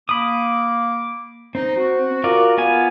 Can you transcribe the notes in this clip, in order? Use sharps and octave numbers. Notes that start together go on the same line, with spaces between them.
A#3 B5 D6 D#6
C4 D#4
F#4
F4 A#4 D5
B3 F4 G#5